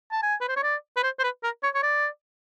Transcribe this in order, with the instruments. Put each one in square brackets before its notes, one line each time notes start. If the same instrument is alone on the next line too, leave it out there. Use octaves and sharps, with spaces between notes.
[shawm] A5
G#5
B4
C5
C#5
D5
B4
C5
C5
B4
A#4
C#5
C#5
D5